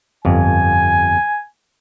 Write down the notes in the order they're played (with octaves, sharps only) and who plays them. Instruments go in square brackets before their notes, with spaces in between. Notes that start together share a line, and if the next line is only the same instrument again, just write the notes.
[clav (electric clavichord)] G1 F2 [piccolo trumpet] G#5